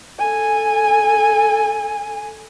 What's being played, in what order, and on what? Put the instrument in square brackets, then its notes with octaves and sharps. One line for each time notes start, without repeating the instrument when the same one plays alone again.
[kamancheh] A4 G#5